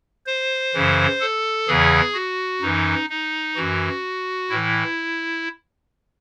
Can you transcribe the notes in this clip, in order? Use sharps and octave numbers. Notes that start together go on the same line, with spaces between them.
C5
F#2 C#3 E3
A4
E2 C#3 E3 G#4
F#4
F#2 E3 D#4
D#4
F#2 E3 F#4
A2 E3 E4